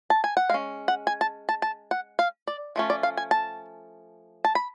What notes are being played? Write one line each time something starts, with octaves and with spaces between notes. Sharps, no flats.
A5
G#5
F#5
G#3 C#4 F5
F#5
G#5
A5
A5
A5
F#5
F5
D5
F3 A3 C#4
D5
F5
G#5
A5
A5
B5